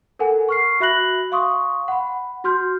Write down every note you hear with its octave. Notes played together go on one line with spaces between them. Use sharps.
A4 A#4 F#5 G#5
C#6 F6 C7
F#4 E5 B5 F#6 A#6 F#7
F5 C6 C#6 D#6
F#5 B5
F#4 C6 F6 G6